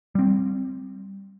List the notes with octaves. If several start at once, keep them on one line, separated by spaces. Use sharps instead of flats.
G3 C4